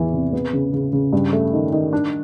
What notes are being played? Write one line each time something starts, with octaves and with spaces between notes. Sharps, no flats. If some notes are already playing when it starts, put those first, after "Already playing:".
Already playing: E2 E3
C3
B3
C#3
C#3
C#3
G2
A3
D#3
D#3
D4